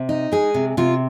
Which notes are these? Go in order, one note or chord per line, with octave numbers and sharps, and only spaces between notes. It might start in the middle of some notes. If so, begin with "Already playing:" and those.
Already playing: C3
D#4
G#3 G#4
C3
C3 F4